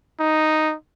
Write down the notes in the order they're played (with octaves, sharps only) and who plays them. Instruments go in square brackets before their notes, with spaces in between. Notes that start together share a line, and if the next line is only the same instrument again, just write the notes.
[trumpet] D#4